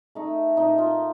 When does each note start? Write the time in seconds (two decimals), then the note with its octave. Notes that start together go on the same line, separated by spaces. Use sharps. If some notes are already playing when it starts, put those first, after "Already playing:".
0.15 A3 D#4
0.57 A#2 D#4
0.78 F4